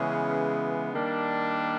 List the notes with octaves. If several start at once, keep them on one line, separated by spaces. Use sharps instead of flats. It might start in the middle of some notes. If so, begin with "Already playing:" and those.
Already playing: C#3 E3 G#3 B3 C#4
D#3 G3 A#3 D4